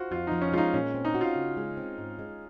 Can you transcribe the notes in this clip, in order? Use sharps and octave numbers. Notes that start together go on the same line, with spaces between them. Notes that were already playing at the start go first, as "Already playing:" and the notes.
Already playing: F4 F#4 C5
F2 F4
F3 D#4
C#4
G#3 D#4 F4
A#2 C#4
C4
D#4
F#4
F4
C#3
G#3
C4
G#2
G#3